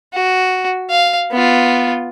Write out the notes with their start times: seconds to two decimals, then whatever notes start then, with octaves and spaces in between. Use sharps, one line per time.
0.13 F#4
0.90 F5
1.31 B3 F4